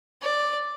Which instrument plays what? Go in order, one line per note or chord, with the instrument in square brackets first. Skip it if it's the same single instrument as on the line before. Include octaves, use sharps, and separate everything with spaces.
[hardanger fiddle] D5